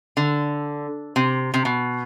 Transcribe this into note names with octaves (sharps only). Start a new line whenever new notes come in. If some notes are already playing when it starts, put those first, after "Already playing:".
D3
C3
C3
B2